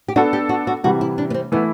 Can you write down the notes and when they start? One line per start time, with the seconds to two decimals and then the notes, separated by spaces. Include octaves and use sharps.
0.08 G4
0.16 B3 D4 F#4 A4
0.33 G4
0.49 F#4
0.67 F#4
0.84 C3 E3 G3 F#4
1.01 E4
1.18 D4
1.30 B3
1.34 C4
1.52 E3 A3 B3 E4